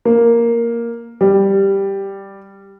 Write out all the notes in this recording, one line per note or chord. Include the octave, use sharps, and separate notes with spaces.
A#3
G3